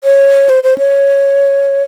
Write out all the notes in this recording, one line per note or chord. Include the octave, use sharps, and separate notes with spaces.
C#5
C5
C5
C#5